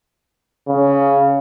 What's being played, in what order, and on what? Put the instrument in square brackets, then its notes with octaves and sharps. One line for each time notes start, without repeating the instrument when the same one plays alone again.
[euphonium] C#3